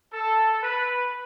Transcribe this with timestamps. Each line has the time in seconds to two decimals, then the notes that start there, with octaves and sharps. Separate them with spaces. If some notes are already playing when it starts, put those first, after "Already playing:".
0.12 A4
0.61 B4